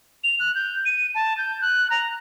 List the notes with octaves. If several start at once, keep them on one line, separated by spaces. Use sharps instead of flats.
F7
F#6
G6
D#7
A5
G6
F#6
A#5